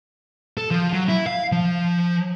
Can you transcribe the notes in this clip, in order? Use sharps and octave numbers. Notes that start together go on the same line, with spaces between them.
A4
F3
F#3
E4
F5
F3